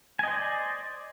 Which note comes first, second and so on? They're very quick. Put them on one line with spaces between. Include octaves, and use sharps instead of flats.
G#5 D#5 C5 D5